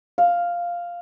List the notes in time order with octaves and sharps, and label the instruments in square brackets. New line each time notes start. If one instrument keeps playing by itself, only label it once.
[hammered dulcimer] F5